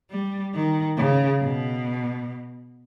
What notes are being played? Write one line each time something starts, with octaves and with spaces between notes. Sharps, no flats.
G3
D#3
C#3
B2